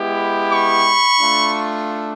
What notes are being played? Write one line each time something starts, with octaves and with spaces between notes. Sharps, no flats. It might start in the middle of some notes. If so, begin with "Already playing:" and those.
Already playing: G#3 B3 E4 G4
B5 C#6
A3 D4 F4